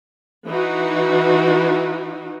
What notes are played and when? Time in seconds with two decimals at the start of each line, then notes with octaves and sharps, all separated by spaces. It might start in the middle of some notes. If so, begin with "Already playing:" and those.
0.47 E3 D#4 F#4